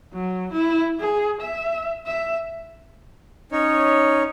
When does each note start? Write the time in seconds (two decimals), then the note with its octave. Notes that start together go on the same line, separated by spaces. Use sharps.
0.13 F#3
0.53 E4
1.00 G#4
1.41 E5
2.07 E5
3.52 C#4 D#4 C#5